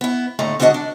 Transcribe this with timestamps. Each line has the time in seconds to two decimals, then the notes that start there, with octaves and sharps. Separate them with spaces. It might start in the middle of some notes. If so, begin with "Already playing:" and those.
0.01 B3 E4
0.39 D#2 A2 D3 A3 A#5
0.59 D3 G#3 D4 F#4 D#5 F#5
0.74 D4